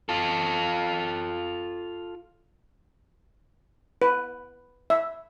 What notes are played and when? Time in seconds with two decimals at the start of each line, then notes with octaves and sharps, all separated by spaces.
0.09 F4 A4
4.02 B4
4.90 E5